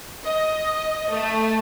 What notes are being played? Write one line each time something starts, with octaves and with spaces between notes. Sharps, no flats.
D#5
A3